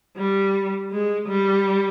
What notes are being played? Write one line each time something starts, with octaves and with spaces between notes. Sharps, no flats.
G3
G#3
G3